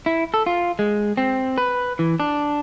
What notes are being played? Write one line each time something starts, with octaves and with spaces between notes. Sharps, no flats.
E4
A4
F4
G#3
C4
B4
E3
D4